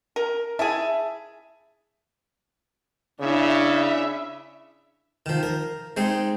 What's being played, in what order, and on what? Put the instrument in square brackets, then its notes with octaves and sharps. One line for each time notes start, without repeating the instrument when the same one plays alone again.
[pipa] A#4
[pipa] E4 G#4 [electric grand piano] E5 A5
[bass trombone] C#3 [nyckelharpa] D4 E4 [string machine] E5
[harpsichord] D#3 F3
A#4
G#3 C4 D#4